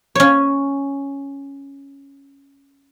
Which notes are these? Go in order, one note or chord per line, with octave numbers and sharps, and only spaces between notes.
C#4 C#5